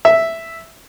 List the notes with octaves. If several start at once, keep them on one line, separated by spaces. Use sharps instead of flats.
E5